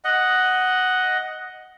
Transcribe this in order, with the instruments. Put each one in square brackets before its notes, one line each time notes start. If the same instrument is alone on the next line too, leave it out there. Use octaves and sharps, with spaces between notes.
[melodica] D#5 F#5